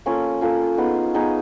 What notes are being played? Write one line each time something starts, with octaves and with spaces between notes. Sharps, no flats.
A#3 C#4 F4 A4
A#3 C#4 F4 A4
B3 D#4 G#4
B3 D#4 G#4